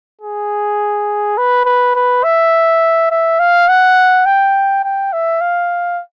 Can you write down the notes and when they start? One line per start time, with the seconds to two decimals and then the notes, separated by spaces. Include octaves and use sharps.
0.21 G#4
1.37 B4
1.65 B4
1.95 B4
2.24 E5
3.11 E5
3.39 F5
3.69 F#5
4.26 G5
4.84 G5
5.13 E5
5.41 F5